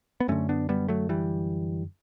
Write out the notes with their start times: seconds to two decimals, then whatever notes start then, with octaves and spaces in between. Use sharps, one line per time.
0.20 B3
0.28 F#2 D3 A3 C#4
0.49 B3 D4
0.69 G3 B3
0.89 F#3 A3
1.09 E3 G3